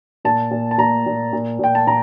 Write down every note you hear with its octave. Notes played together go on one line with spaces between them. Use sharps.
A#2 A5
A#2
A5
A#2 A#5
A#2
A#2
A#2 G5
A5
A#2 A#5